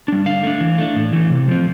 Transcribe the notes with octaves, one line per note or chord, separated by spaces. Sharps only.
G3 D4
D3 F5
A3 D4
E3
A3 D4
A2
E3 A3
C3
F3 C4